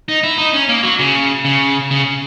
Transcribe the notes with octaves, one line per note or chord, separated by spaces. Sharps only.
D#4
E4
D#4
C#4
A#3
F#3
C#3
C#3
C#3